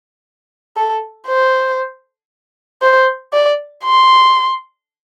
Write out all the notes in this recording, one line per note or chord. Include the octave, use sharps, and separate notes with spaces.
A4
C5
C5
D5
C6